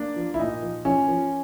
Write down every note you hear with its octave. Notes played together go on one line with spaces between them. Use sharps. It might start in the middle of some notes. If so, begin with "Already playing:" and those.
Already playing: A#3 D4
F3
E4
A#2 D#4
F3
F3 C#4
F3